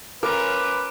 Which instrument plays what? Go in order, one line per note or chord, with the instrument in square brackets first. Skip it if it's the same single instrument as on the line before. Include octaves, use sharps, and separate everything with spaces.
[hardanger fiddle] C#4 F4 [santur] A#4 [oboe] B4 [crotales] D6